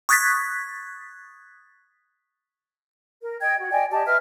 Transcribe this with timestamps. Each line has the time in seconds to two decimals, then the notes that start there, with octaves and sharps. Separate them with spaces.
0.09 C#6 D#6 F#6 G#6 A6 B6
3.21 A#4
3.40 D#5 G5 G#6
3.59 F#4
3.71 D5 D#5 G5 G#5
3.92 G4 D5 D#5 A5
4.06 B4 D#5 E5 F6